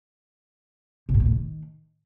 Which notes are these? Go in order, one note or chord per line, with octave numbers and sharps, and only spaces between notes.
C3
G#2
B2
A2
D#3